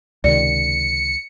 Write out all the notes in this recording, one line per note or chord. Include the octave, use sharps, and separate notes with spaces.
C#2 C3 D#3 D5 C#7